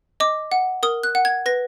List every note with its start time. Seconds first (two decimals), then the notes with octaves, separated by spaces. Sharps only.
0.20 D#5 D6
0.52 F#5
0.83 A#4 D#6
1.03 F#6
1.15 F#5
1.25 G#6
1.46 B4 A#6